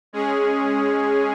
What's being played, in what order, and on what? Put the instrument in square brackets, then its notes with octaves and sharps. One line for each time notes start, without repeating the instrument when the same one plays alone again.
[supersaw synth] G#3 C#4 G#4